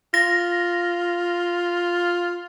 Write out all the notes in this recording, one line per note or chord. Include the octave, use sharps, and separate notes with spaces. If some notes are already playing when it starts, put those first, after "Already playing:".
F4 A#6